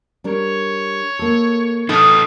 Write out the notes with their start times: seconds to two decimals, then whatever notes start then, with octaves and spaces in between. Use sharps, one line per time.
0.24 G3 D4 A#4 C#5
1.19 A#3 A4
1.89 D#4 A4 D#6 F6